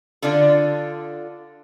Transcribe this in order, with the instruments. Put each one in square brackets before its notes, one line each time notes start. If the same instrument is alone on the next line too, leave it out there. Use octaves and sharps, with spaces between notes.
[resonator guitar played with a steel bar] D3 D4 F4 A4